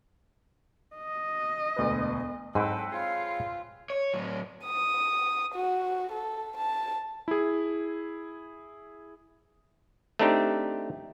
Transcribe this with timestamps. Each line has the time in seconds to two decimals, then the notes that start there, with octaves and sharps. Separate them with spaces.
0.96 D#5
1.76 E1 D2 B4
2.55 G#2 F#3 C4 A4 B4 F#5 G5
2.90 F4 G#4 C#5 F5
3.90 C#5
4.14 A2 F#3
4.65 D#6
5.55 F#4
6.12 A4
6.58 A5
7.28 E4 G#4
10.19 A3 C4 D4 D#4 G4 C5